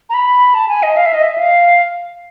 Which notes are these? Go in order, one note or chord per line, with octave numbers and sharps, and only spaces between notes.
A#5
B5
A5
G#5
D#5
F5
E5
D#5
E5
F5